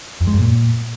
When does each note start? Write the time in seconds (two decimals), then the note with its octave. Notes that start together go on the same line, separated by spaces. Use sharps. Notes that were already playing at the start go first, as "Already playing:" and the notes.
0.21 F2
0.27 G#3
0.34 F#2
0.40 A#2